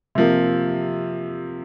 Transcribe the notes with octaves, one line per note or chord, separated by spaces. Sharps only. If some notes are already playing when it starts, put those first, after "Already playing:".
C3 F3 A#3